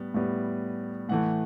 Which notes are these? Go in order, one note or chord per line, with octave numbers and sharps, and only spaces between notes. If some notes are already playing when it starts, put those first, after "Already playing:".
Already playing: A2 G3 B3
A2 G3 B3
A2 E3 A3 F#5